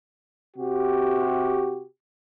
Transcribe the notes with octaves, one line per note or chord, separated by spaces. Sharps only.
C3 F#4 G4